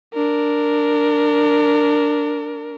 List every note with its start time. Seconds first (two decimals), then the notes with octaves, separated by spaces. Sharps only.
0.14 D4 A#4